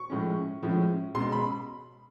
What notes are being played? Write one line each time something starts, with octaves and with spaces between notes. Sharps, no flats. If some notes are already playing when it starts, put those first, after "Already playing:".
Already playing: C#6
A2 F3 G#3 C#4
A2 F3 G#3 C#4
B2 G#3 C#4 C6
B5